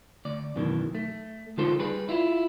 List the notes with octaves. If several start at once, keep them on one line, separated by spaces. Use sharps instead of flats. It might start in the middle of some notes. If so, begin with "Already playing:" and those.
D2 D5
F#2 B2 D#3 E3
A3
D3 G#3 D#4 F4 A4 C5
G3 G#4 B4
E4 F4